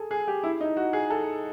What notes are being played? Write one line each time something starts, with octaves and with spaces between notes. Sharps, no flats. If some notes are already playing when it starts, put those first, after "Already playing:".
Already playing: G#4 A4
G#4
G4
E4
D#4
F#4
G#4
A4